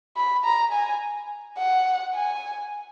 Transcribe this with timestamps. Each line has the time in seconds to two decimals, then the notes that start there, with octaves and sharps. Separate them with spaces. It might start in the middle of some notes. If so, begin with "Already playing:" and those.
0.17 B5
0.45 A#5
0.73 G#5
1.58 F#5
2.15 G#5